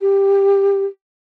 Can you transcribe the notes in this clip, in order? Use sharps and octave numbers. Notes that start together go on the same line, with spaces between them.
G4